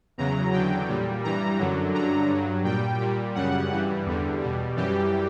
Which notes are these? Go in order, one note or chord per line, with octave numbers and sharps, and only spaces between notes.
E2 C#3 F#3 A#5
E2 D3 F#3 G5
A#2 G3
G2 E3 G3 A#5
F#2 D3 F#3
G2 D3 F#3 A#5
G2 F#3
A#2 G3 G5
A#2 G3
F#2 C#3 G3 F#5
G2 E3 G3
E2 D3 G3
B2 G3
F#2 E3 G3 G4